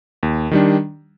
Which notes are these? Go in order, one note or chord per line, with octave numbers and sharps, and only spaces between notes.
D#2
D#3 G3 D4